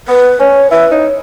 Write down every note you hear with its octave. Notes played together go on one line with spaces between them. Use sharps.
B3 B4
C#4 C#5
E4 B4
D#4 C#5